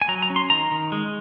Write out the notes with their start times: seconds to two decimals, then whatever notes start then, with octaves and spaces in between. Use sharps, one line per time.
0.02 G#5
0.08 F#3 A#5
0.22 A#5
0.30 C#4
0.36 C6
0.50 D#3 A#5
0.72 D#3
0.92 G#3